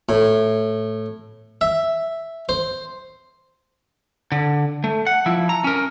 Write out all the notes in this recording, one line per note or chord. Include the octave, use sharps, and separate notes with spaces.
A2
E5
C5
D3
A3
F#5
F3 E4
A#5
C#4 A#4